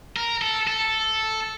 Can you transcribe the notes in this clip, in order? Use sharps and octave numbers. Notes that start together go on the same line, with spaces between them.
A#4
A4
A4